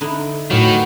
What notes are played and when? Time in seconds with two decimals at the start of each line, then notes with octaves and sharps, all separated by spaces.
0.01 D3 D#4 E4
0.51 A2 D#3 F#3 F#4 G4 B4